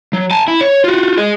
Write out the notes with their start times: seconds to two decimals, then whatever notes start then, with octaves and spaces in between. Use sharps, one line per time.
0.13 F#3
0.31 G#5 A5
0.48 E4
0.61 C#5
0.84 F4 F#4
1.17 G#4 D#5